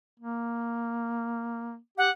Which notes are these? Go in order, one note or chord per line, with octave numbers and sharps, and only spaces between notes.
A#3
G4 F#5